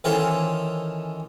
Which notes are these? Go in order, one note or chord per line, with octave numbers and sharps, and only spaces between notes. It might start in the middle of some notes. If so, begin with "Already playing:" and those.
D#3 E3 C#4 F4 A4 C5